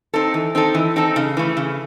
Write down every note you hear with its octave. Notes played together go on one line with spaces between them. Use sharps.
C4 D#4 A4
E3
C4 D#4 A4
E3
C4 D#4 A4
C#3
E3 A3
C#3